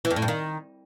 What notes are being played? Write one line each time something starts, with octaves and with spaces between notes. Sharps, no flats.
E3
F2
A2
G2
D#3